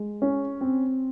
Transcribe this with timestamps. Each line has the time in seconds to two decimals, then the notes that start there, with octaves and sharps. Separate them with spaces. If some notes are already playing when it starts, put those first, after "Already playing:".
Already playing: G#3
0.22 C#4
0.61 C4